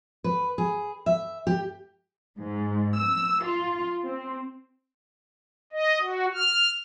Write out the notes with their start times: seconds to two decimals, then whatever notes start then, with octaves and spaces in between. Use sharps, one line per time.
0.24 B4
0.58 G#4
1.06 E5
1.47 G4
2.38 G#2
2.97 E6
3.44 F4
4.06 C4
5.73 D#5
6.01 F#4
6.35 F6